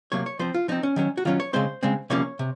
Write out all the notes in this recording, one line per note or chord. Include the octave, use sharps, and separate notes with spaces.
C3 F#3 A#3 C#5
C#5
F3 C4 C5
F4
F3 C4 D#4
C#4
D#3 F#3 C#4
F#4
D#3 F#3 C#4 F4
C#5
C#3 G#3 C4 C5
C#3 G#3 C4
C3 F3 A#3 C#4 C#5
C3